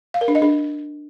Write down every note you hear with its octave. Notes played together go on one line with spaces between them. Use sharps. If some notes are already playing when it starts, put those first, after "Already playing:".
F5
A#4
D4
D#5
D4